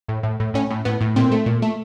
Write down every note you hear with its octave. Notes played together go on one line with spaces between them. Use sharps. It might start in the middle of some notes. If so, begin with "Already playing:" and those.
A2
A2
A2
A2 C#4
A2
A2 B3
A2
A#2 C4
A3
A#2
A3